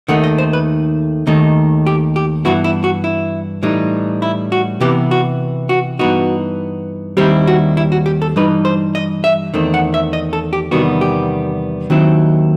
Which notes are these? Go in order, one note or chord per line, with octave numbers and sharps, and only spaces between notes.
D#2 D#3 A3 D#4 F#5
D#5
C5
B4
D#2 D#3 A3 D#4
G4
G4
G2 E3 B3 E4 F#4
E4
F#4
E4
A2 E3 G3 D#4
E4
F#4
C3 E3 B3 G4
F#4
F#4
G2 E3 B3 D#4 F#4
D#2 D#3 G3 C4 E4 G4
F#4
E4
F#4
G4
A4
G2 E3 G3 D#4 B4
C5
D#5
E5
E2 D#3 A3 C4
F#5
E5
D#5
A4
G4
E2 C3 D#3 G3 B3 F#4
G4
D#2 D#3 F#3 C4 E4